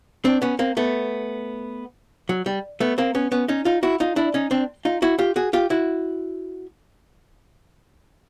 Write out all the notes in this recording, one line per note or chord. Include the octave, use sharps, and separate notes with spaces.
C4 D4
B3 C#4
A#3 C4
A3 B3
F#3
G3
A3 B3
A#3 C4
B3 C#4
B3 C#4
C#4 D#4
D#4 F4
E4 F#4
D#4 F4
D4 E4
C#4 D#4
C4 D4
D#4 F4
E4 F#4
F4 G4
F#4 G#4
F4 G4
E4 F#4